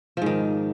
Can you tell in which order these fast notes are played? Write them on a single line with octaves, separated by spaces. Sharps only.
F3 G#2 D#3